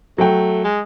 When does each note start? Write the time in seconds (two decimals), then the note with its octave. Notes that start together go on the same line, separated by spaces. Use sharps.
0.18 F#3 A3 G5
0.64 G#3